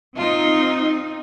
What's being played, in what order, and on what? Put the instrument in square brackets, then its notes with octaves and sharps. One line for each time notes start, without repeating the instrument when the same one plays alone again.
[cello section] C4 D#4 [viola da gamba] F4